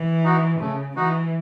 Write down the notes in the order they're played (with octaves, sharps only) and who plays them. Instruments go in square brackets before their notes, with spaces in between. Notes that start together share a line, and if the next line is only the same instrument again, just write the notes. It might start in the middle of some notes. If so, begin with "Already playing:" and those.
Already playing: [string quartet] E3
[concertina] D#4 F#4
[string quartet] C#3 [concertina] A3
[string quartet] E3 [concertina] D#4 F#4